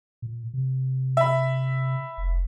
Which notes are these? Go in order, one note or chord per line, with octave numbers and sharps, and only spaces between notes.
A#2
C3
E5 B5
F1